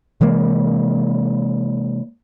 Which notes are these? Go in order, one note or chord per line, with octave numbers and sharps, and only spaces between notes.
C3 E3 G#3 A#3